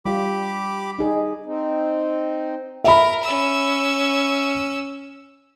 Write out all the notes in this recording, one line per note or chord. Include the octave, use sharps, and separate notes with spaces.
G3 F4 G4 B5 D6
D#4 G#4 D#5
C4 D#4
A#4 E5 B5
C#4 E6